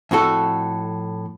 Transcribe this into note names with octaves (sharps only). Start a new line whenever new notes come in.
F2 A2 F#4 A4